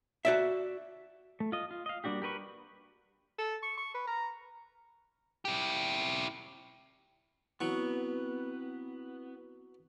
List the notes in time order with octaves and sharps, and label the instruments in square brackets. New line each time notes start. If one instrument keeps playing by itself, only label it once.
[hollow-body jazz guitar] F#4 D5 E5
[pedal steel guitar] A3
F4 D#5
F4
D#5 F5
G3 A#3 D4 F#4 G4
G4 A#4 B4 C#6
[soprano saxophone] A4
C#6
C#6
B4
A#5
[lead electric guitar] E4 G4
[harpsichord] F#3 C#6 [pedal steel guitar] B3 [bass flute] C4 [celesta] E4